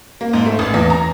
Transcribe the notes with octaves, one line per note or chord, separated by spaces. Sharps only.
A#3
G#2
A3
A1
E2
A#5